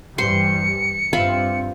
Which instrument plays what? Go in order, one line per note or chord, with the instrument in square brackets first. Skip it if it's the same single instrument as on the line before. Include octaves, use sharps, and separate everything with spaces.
[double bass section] G2 E3 G3 [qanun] C5 C6 [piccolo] C#7
[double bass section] G2 C4 [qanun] F4 E5 B5